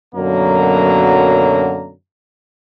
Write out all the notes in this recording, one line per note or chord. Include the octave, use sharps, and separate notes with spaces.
F#2 B2 D3 F#3 A#3 A#5